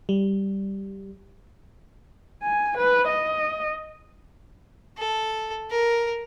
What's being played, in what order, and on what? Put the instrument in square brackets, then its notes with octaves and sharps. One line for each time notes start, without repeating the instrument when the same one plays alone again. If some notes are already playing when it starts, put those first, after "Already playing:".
[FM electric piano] G3
[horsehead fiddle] G#5
B4
D#5
[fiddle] A4
A#4